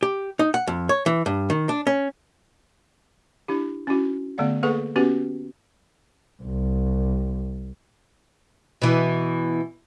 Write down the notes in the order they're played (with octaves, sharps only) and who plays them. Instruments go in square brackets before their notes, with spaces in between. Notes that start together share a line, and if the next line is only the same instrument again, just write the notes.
[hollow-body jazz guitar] G4
D#4
F#5
F2
C#5
E3
G2
D#3
D4
C#4
[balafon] D4 E4 G4
C#4 E4 F#4
D3 A3 B3 D5 F5
A#3 G#4 A4 B4 F#5 C#6
B3 C#4 F#4 G4 B4
[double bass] C2
[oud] B2 E3